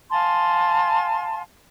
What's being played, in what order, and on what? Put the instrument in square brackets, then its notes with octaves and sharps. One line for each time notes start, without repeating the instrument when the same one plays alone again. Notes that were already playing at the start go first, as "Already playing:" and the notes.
[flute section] F5 G#5 A5 C6